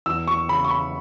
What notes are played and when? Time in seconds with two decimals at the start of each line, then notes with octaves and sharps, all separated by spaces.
0.06 E2 E6
0.28 C#6
0.49 C#3 B5
0.65 C#6
0.71 B5